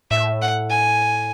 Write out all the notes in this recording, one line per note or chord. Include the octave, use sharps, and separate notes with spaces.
A2 E5
F#5
G#5